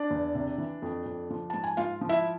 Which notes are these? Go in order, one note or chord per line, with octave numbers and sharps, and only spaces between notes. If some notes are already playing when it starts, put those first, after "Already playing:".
Already playing: D4 D5
E2
C3
E3
F2
F2
F3
G#2 A5
G#5
G#2 F4 F5
F3
E4 E5